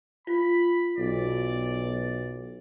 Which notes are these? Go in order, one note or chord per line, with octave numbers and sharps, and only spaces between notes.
F4 B5
B1 D5